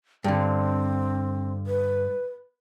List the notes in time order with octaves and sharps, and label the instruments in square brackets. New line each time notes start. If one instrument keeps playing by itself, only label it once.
[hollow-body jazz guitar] G2 D3 [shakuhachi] C4
[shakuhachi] B4